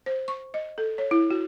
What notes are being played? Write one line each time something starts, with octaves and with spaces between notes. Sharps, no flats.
C5
C#6
D#5
A4
C#5
E4
F#4